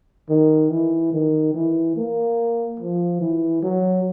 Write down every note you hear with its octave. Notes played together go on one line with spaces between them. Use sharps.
D#3
E3
D#3
E3
A#3
F3
E3
F#3